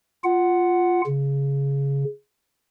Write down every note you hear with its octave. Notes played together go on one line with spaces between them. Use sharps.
F4 F#5
C#3